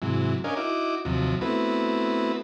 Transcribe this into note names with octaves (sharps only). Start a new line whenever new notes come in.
G#2 C3 E3 F#3
C#4 D4 A#4 D#5 F5 G#5
D#4 E4 F#4 D6
D#2 C3 F3 F#3
A3 B3 C4 E4 F#4 B4